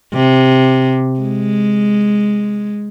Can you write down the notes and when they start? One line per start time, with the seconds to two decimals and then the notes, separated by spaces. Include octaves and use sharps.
0.14 C3
1.20 G#3